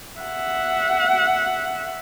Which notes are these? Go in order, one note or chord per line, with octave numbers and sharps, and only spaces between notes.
E5 F#5